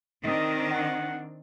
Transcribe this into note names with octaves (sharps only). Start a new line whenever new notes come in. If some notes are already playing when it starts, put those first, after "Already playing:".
D#3 C4 D4 D#5
F#5